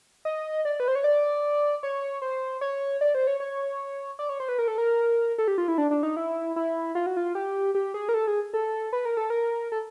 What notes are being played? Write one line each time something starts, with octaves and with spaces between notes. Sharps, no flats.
D#5
D5
B4
C5
C#5
D5
C#5
C5
C#5
D5
C5
C#5
C#5
D5
C#5
C5
B4
A#4
A4
A#4
A4
G4
F4
E4
D4
D4
D#4
E4
E4
F4
F#4
F4
G4
G4
G#4
A#4
A4
G#4
A4
B4
A#4
A4
A#4
A4